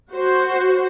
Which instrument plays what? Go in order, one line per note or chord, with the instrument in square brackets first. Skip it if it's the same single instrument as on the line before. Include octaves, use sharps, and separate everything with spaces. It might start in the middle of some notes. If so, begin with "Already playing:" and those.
[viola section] F#4 C5